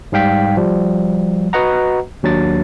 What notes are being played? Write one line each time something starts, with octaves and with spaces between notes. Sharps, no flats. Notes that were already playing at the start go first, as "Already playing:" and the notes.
G#2 G3 F5 G5 B6
F3 G3
F#4 B4 D#5 F#5 A#5
D#2 F#3 D4 A6